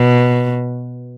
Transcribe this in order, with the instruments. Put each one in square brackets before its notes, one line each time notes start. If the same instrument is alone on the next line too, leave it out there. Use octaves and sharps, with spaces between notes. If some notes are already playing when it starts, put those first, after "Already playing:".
Already playing: [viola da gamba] B2